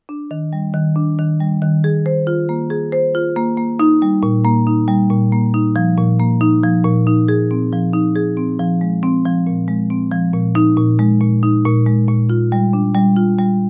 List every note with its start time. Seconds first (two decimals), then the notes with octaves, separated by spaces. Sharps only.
0.09 D4
0.31 D#3
0.53 G3
0.74 D#3
0.96 D4
1.19 D#3
1.40 G3
1.62 D#3
1.84 G#4
2.06 C5
2.27 F4
2.49 A#3
2.70 G#4
2.92 C5
3.15 F4
3.36 A#3
3.57 A#3
3.79 D#4
4.02 G3
4.23 A#2
4.44 A#3
4.67 D#4
4.88 G3
5.10 A#2
5.32 A#3
5.54 D#4
5.76 F3
5.97 A#2
6.20 A#3
6.41 D#4
6.64 F3
6.85 A#2
7.07 D#4
7.28 G#4
7.51 C4
7.73 F3
7.93 D#4
8.16 G#4
8.37 C4
8.59 F3
8.81 G#3
9.03 C4
9.25 F3
9.47 A#2
9.68 G#3
9.90 C4
10.11 F3
10.34 A#2
10.55 D#4
10.77 A#2
10.99 G#3
11.21 A#2
11.43 D#4
11.65 A#2
11.86 G#3
12.08 A#2
12.29 F4
12.52 G3
12.73 D4
12.95 G3
13.16 F4
13.38 G3